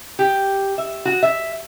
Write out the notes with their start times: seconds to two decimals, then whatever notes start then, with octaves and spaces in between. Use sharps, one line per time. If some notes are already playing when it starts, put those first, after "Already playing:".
0.19 G4
0.78 E5
1.05 F#4
1.23 E5